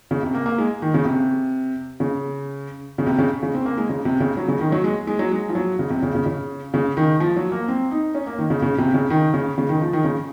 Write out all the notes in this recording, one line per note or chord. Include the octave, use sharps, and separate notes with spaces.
C#3
C3
A#3
A#3
G#3
D#3
C#3
C3
C#3
C#3
C3
C#3
C#3
C4
A#3
G#3
C#3
C3
C#3
F#3
C#3
D#3
F#3
G#3
G#3
F#3
G#3
F3
F#3
C#3
C3
C#3
C#3
C#3
C#3
D#3
F3
F#3
A#3
C4
D#4
C#4
A#3
D#3
C#3
C#3
C3
C#3
D#3
C#3
C#3
D#3
F3
D#3
C#3